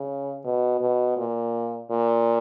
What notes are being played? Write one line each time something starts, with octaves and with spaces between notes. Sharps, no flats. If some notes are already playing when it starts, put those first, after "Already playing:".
Already playing: C#3
B2
B2
A#2
A#2